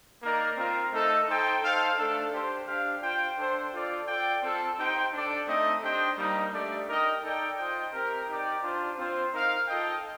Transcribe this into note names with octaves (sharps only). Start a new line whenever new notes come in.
A#3 D#4 A#4 D5
C4 F4 A#4 F5
A3 D#4 A4 C5
D#4 A4 C5 G5
D#4 A4 C5 F5
A3 D4 A4
D4 G4 C5
D4 G4 D5 F5
F4 C5 G5
D4 A4 C5 G5
F4 A4 D5
F4 A4 D5 G5
C4 F4 A4
D#4 G4 C5 G5
D4 A4 D5
A3 C4 D#4 A4 D#5
D4 G4 C5 D#5 G5
G3 A#3 D#4
A3 D4 G4 D5
D#4 A#4 D#5 G5
D#4 A4 D5 G5
F4 C5 D#5 G5
C4 G4 A#4
D#4 G4 D5 G5
D4 F4 C5
C4 F4 C5
D#4 A#4 F5
F4 A4 D#5 G5